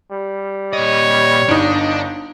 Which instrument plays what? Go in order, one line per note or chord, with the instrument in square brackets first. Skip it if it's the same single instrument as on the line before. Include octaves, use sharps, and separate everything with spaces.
[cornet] G3
[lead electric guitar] A#2 D#5 [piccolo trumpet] C#5
[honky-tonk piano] G1 D#4 [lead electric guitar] D4 D5